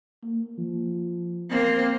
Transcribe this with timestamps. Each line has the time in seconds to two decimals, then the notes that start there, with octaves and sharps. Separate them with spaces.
0.23 A#3
0.58 F3
1.50 A#3 C4